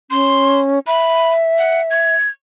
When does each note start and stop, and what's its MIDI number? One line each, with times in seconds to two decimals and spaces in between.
0.11 0.79 61
0.11 0.60 84
0.87 2.15 76
0.87 1.31 83
1.58 1.82 78
1.90 2.29 92